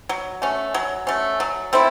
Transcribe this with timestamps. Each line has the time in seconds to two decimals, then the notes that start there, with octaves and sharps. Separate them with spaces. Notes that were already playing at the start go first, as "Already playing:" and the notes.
0.09 F#3
0.42 A3 C#4
0.74 F#3
1.07 A3 C#4
1.40 F#3
1.73 A3 C4 E4